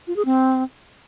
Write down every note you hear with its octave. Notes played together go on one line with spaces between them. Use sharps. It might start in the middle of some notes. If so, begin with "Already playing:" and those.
F4
G#4
C4